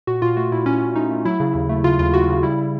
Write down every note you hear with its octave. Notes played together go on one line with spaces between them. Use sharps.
A#2 F#4
A#2 F4
A3 F#4
A#2 E4
A#2 C#4
A#2
A3 D#4
A3
F#3 E4
C#3
D#2
A3
C#3 F4
D#2 F4
C#3 F#4
C#3
G3 E4